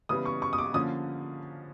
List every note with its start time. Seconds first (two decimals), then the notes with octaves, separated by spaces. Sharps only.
0.09 C#3 E3 G3 B3 D#6
0.26 C#6
0.42 C#6
0.53 D#6
0.58 D6
0.74 D3 F3 A#3 C#4 D#6